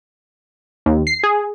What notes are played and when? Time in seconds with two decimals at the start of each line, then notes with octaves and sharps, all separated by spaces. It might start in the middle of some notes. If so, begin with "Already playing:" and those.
0.86 D#2
1.07 C7
1.23 G#4